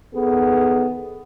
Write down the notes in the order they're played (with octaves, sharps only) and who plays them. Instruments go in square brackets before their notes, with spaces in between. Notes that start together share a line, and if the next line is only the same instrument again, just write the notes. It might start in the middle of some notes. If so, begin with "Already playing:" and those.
[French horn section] D#3 B3 G#4 A4